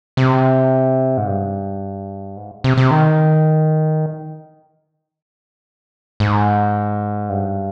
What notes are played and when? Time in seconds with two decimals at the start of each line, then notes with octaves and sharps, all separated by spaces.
0.17 C3
1.18 G#2
1.27 G2
2.37 G#2
2.64 C3
2.77 C3
2.91 D#3
6.20 G#2
7.29 G2